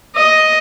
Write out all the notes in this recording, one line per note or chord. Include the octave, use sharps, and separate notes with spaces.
D#5